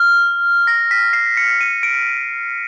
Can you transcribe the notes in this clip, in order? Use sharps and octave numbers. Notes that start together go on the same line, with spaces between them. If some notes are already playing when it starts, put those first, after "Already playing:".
Already playing: F6
A#6
B6
C7
C#7
D#7
D7